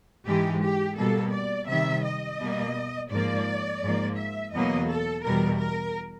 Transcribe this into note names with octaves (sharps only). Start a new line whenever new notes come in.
G#2 E3 G#3 G4
G4
B2 G3 A#3 A4
D5
C3 D#3 G3 E5
D#5
B2 G3 A#3
G#2 F3 A#3 D5
G#2 F3 A#3
E5
E2 B2 F#3 A#3 D#5
A4
E2 B2 G3 A#4
A#4